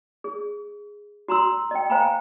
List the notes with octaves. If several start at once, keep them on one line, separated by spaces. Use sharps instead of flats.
G#4
F#4 A#5 C6 E6
D#5 G5
C5 F5 G5 G#5 A#5 B5